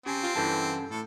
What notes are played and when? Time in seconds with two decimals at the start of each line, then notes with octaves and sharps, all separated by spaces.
0.06 C#3 C4 G4 G#5 A5
0.23 F4
0.36 G2 C#3 E3 A4 A5 G6
0.91 A2 A4